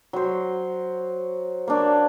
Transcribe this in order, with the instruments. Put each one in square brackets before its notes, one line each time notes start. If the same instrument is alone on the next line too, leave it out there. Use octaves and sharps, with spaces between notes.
[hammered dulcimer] F#3 C5
A#3 D4 C#5